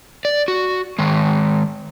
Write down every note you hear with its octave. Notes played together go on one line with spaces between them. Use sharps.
D5
F#4
D#3 G#3